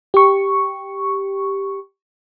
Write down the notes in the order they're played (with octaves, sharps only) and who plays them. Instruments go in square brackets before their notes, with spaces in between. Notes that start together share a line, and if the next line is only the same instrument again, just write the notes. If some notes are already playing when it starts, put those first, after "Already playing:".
[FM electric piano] G4 C#6